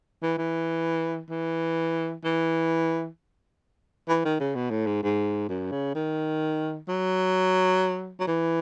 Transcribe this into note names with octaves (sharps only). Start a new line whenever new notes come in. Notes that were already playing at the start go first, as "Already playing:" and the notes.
E3
E3
E3
E3
E3
D#3
C#3
B2
A2
G#2
G#2
F#2
C#3
D#3
F#3
F#3
E3